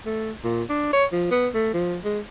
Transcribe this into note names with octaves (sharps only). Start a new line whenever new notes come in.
A3
A#2
D4
C#5
F3
B3
A3
F3
G#3